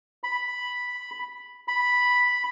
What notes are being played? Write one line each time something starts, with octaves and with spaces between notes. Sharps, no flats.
B5
B5